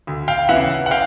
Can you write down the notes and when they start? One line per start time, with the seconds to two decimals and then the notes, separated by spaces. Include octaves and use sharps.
0.07 D2
0.28 F5 G5
0.49 C#3 E3 E5 F#5
0.86 F#5
0.91 F5 G5